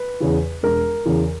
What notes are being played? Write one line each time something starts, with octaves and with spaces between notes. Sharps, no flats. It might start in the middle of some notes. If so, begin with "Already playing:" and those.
Already playing: B4
E2 C#3 E3
E1 A#4
E2 C#3 E3